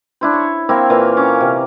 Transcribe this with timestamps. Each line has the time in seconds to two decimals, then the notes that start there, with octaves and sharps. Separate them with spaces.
0.21 D4 E4 C5
0.34 C#5
0.69 A#3 C4 E4
0.90 A#2 E3 F5
1.17 C#4 D6
1.41 C3